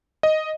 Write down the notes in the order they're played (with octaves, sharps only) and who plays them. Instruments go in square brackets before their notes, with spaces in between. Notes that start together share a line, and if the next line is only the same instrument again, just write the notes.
[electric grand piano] D#5